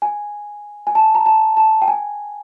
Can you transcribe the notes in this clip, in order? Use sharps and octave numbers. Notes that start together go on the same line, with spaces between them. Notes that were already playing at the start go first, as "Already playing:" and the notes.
G#5
G#5
A5
A#5
A5
A5
G5
G#5